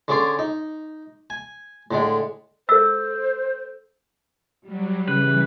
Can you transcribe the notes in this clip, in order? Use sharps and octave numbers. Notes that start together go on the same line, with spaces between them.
D3 C#4 G#4 D5 C6
D#4
G#5
A2 D3 G#3
A4 C5 E6
F#3 G3
C#3 E3 B4